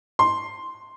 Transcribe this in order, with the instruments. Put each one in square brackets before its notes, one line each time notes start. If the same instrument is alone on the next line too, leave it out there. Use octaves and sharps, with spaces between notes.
[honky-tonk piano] C6